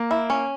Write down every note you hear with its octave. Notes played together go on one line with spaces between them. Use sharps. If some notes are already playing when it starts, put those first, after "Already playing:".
Already playing: A#3
E4
C#4